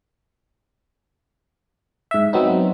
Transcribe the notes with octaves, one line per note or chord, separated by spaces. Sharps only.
G#2 E5
F#3 B3 C4 D#4